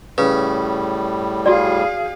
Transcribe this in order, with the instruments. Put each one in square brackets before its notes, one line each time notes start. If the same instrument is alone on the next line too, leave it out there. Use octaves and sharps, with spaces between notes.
[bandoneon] A2 G3 [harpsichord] C#3 [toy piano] B4
[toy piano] F#4 D5 [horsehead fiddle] G#4 F5